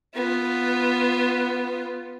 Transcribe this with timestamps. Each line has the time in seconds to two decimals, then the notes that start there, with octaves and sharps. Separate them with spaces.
0.15 B3 F4